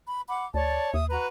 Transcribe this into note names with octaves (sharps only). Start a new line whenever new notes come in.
B5
F#5 B5 D6
D2 C#5 D5 A5
D#2 E5 D#6
F#4 B4 A#5